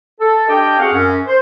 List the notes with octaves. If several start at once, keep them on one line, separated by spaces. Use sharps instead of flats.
A4
D4 G4 A4 D#5 G5
C4 F#4 G#4 F5 F#5
F#2 C#4
C5